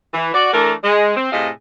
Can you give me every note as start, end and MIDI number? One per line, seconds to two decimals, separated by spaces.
0.14 0.30 52
0.34 0.50 66
0.34 0.50 74
0.53 0.71 52
0.53 0.71 57
0.53 0.71 62
0.53 0.71 70
0.83 1.14 56
1.16 1.29 60
1.32 1.48 45
1.32 1.48 48
1.32 1.48 68
1.32 1.48 69
1.32 1.48 75
1.32 1.48 77